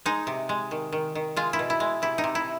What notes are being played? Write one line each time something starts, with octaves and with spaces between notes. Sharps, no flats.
G#3 D#4
C3
G#3
D#3
D#3
D#3
G#3 F4
E4
B2
E4
G#3
C3 E4
D#4
C3
E4